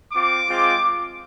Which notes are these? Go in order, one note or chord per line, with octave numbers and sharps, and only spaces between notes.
C4 F4 D6
G#3 C4 F4